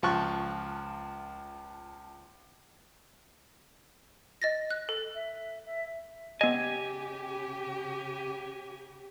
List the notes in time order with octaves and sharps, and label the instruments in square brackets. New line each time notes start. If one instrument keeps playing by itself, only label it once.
[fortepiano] C#2 F3 A5 C#6 F#6
[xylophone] D#5 A6 A#6
F#6
A4
[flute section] E5
E5
[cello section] C#3 G4 [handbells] B3 D#5 [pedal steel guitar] G#5